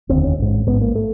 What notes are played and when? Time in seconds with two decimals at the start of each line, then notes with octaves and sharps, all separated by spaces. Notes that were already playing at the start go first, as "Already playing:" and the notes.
0.09 F1 D#2 D3 C4
0.23 C#4
0.38 A1 G#2
0.66 A1 G#2 B3
0.81 A#3
0.95 A3